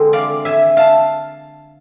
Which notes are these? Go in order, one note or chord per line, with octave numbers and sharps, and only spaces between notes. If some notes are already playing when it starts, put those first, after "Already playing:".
Already playing: D3 G#3 C4
D5 F5
E5 G#5
F5 A5